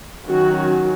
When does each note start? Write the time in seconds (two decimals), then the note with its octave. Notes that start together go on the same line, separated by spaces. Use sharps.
0.25 D#3 F#3 C#4 F#4